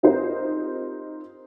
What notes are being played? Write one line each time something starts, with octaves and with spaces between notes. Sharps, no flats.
C4 D#4 F4 G4 A#4 C5